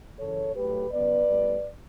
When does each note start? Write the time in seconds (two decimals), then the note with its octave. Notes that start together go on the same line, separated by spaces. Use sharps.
0.18 F#2 C#3 E3 A4 C#5
0.55 A2 F#3 A3 G4 B4
0.91 C#3 F#3 B3 B4 D5
1.28 A2 G3 B3